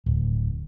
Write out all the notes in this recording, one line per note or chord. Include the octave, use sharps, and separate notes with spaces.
D1